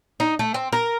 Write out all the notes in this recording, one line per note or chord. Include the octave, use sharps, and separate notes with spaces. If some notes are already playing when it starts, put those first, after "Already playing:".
D#4
A3
C4
A#4